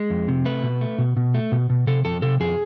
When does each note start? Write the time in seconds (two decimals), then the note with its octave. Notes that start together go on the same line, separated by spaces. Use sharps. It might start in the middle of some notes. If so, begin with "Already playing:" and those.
Already playing: G#3
0.10 F2
0.28 C3
0.45 A3 B4
0.63 B2
0.81 A3
0.98 B2
1.17 B2
1.34 A3
1.52 B2
1.70 B2
1.87 C3 A4
2.05 F2 A4
2.22 C3 A4
2.40 F2 G#4